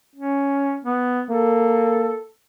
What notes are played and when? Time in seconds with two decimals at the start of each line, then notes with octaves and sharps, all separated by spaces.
0.16 C#4
0.85 B3
1.30 A#3 A4